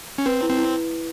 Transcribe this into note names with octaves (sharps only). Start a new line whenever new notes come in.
C#4
C4 B4
E4
C4
E4